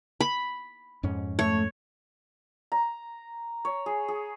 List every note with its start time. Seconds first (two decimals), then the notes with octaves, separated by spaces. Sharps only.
0.21 B5
1.03 F2 G#2 C#4
1.39 A3 C#5
2.72 A#5
3.65 C#5
3.86 G#4
4.08 G#4